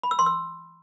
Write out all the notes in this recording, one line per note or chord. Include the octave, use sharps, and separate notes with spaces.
B5
E6
C6
E6